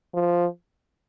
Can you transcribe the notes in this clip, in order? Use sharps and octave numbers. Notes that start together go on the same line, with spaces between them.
F3